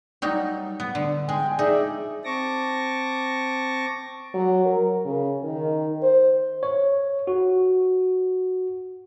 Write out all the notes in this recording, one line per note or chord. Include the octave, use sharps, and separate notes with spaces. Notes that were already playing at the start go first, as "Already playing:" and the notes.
F#3 G3 D#4
B3
D3
G#3 G5 G#5
D#4 G#4 D5 E5
C4 A5 C#6 D6 A#6
F#3
A#4
C#3
D#3
C5
C#5
F#4